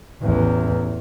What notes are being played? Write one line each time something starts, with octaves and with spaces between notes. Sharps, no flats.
A1 E2